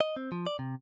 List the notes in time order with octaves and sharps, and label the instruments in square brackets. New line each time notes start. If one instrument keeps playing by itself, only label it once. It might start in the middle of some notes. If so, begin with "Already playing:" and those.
[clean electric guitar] D#5
C4
F3
D5
C3